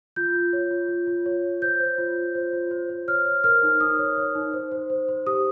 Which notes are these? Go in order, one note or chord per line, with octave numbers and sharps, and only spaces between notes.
F4 G6
F4
C#5
F4
F4
F4
C#5
C#5
C5 G6
C5
F4
F4
C5
F4
C5
C5
C#5 F6
C#5
A#4 F6
D#4
D#4 D#6
C#5
C#5
D#4
C5
C5
C5
C5
G4 D#6